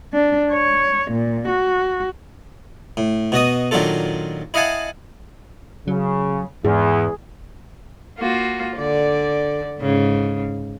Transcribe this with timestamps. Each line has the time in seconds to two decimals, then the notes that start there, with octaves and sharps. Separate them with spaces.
0.13 D4
0.52 C#5
1.11 A#2
1.48 F#4
2.97 A2
3.32 B2 F#4 D#5 D#6
3.71 A#2 D#3 F#3 D4 F4 A4
4.54 E4 D#5 F5 F#5 G#5 A5
5.88 C#3 F#3
6.65 E2 G#2 G#4
8.20 A#3 F4 F#4
8.76 D3 D5
9.79 G#2 C#3